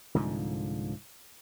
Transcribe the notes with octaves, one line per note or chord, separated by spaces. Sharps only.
C2 G#2 D3 F3